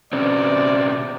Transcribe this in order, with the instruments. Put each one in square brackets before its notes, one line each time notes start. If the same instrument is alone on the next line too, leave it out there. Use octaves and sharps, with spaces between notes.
[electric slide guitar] B2 C4 C#4 [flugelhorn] D5